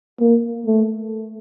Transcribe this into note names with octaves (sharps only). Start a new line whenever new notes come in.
A#3
A3